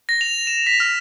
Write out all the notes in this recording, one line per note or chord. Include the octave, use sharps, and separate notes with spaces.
A#6
F7
E7
B6
F6